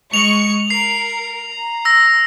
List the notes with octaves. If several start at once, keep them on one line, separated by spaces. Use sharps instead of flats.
G#3 C#6 C#7 F7 F#7
A#4 C7
A#5
E6 A#6